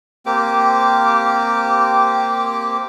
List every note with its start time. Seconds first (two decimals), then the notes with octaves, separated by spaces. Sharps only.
0.26 A#3 C4 G4 D6